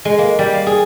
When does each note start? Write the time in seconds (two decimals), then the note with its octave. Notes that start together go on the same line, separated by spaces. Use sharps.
0.05 G#3
0.18 A#3
0.39 G3
0.53 F5
0.67 G#4